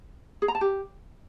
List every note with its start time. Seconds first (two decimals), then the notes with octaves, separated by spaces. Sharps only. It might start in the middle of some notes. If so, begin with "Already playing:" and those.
0.42 G#4
0.48 A#5
0.55 A5
0.61 G4